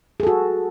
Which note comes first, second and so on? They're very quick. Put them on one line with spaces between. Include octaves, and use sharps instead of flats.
G#4 A4 F#4